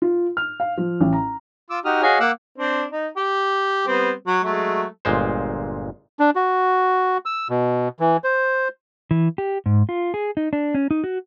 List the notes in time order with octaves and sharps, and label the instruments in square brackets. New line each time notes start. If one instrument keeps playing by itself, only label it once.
[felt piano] F4
F6
F5
F3
A1
A#5
[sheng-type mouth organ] F4 D6 E6
D#4 F#4 G4 D#6 F6
F#4 G#4 C#5 D#5 F5 G#5
A#3 F5 F#5 D6 E6 F#6
[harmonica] C4 D4
D#4
G4
G3 B3 C4
F#3
F#3 G#3 A3
[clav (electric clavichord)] G1 A#2 G#3 C5
[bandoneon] D4
F#4
E6
B2
E3
C5
[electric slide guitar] E3
G4
G#2
F4
G#4
D#4
D4
C#4
D#4
F#4